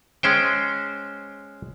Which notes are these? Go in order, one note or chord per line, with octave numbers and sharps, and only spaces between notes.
G#3 C#4 C5 G5